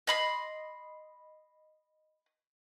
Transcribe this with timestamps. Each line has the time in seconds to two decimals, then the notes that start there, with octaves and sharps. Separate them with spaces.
0.07 D#5 B5 C6